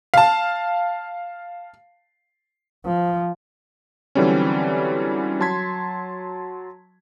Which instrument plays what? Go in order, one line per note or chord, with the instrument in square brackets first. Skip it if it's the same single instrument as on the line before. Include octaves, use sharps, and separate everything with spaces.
[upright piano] F5 A5
[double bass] F3
[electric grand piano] D3 E3 F#3 G3 C4 C#4
F#3 A5 C6 G#6 B6